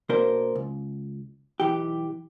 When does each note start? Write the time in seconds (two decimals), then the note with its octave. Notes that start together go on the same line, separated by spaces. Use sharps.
0.09 B2 A#3 D4 A#4 C5
0.55 C#2
1.60 B1 E3 G4